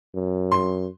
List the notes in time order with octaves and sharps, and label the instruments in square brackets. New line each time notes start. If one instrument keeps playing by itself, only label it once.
[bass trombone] F#2
[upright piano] C6